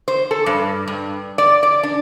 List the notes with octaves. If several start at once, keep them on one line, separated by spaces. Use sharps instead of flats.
C5
A4
G2
G2
D5
D5
D4